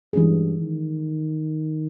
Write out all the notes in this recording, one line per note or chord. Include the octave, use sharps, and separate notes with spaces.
G2 E3 G#3 C#4 G#4
D#3